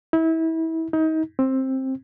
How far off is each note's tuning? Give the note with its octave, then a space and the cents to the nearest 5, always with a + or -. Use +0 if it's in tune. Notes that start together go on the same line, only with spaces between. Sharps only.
E4 -30
D#4 +30
C4 +15